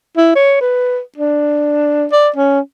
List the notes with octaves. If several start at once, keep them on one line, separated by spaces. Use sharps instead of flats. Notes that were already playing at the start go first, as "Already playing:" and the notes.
E4
C#5
B4
D4
D5
C#4